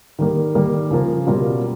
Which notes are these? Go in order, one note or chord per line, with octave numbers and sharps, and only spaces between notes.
D#3 G3 A#3
D#3 G3 A#3
C#3 F3 A#3
B2 G3 A#3 C#4 F4